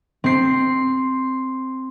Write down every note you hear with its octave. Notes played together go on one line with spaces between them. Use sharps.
C4 C7